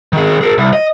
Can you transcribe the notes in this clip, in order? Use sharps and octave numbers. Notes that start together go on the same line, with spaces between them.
D#3 G#4
G#4 A#4
C2
D#5